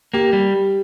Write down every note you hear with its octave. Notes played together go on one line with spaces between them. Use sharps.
A#3 G4
G3